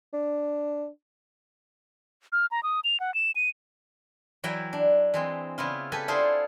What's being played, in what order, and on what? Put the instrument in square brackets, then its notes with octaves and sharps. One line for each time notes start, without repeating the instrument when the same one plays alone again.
[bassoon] D4
[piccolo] F6
A#5
D#6
F7
F#5
E7
D#7
[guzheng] E3 F#3 E4 E5 G5
D4
E3 G#3 C4
C#3 B3 E4 F4
G4 A4 B4 G#5
D4 E4 F4 G#4 A4 C5